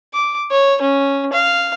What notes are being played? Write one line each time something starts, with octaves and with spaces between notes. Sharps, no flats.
D6
C#5
C#4
F5